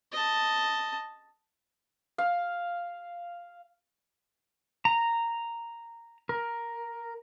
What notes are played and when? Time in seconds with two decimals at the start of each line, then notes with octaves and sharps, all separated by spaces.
0.12 D#5 A5
2.18 F5
4.85 A#5
6.29 A#4